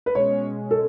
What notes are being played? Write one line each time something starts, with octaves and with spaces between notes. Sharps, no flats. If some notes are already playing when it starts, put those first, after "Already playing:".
B4
B2 G#3 C#4 C#5
A4